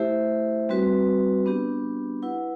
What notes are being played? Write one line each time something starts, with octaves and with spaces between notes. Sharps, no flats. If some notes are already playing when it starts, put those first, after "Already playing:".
Already playing: A3 E4 G4 C5 E5
G3 C4 F#4 B4
B3 D4 G4
E4 B4 F#5